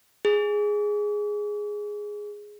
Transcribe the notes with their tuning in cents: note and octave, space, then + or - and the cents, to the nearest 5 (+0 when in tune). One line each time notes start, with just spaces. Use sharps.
G#4 +0